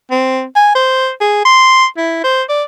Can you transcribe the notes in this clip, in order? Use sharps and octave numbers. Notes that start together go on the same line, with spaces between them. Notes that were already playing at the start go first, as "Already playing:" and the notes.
C4
G#5
C5
G#4
C6
E4
C5
D5